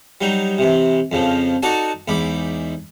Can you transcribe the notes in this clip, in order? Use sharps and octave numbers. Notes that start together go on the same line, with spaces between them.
F#3 G3 D#4
C3 E3
F2 C#3 F3
D#4 F#4 A4 D5 A5
E2 G#2 B5 D6